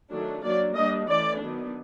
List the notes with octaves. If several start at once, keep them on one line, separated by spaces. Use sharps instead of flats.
D#3 F#3 A3 D4
F#3 A#3 D4 D5
G3 A#3 D4 D#5
E3 A3 C#4 D5
D#3 F#3 B3 D4